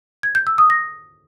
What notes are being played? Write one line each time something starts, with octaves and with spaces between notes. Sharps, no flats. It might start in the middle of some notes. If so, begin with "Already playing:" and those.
G#6
G6
E6
D#6
A#6